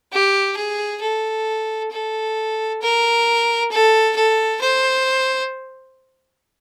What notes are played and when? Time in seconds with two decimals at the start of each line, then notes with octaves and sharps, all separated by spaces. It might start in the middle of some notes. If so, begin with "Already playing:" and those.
0.12 G4
0.56 G#4
1.01 A4
1.92 A4
2.82 A#4
3.71 A4
4.16 A4
4.61 C5